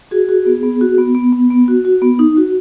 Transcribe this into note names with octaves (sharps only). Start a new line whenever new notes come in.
F#4 G#4
F#4
B3
B3
F#4
B3
B3
B3
B3
F#4
F#4
B3
D#4
F#4